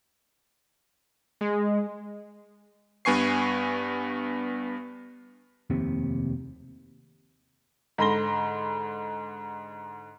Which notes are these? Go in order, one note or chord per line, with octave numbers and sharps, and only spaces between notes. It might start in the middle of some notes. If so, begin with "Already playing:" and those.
G#3
G2 B3 G#5 C#6 C7
F1 D#2 C3
G#2 D3 B5 C6 A#6 G7